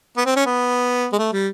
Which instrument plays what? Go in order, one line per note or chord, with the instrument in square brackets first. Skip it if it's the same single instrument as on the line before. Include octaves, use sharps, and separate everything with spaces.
[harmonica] B3
C4
C#4
B3
G#3
A3
G3